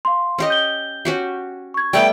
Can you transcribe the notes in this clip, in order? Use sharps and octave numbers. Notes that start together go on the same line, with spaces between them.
F5 C6
C#4 G4 D#5
G6 G7
C#4 F#4 G4
C#6 G#6
G3 A3 B3 G5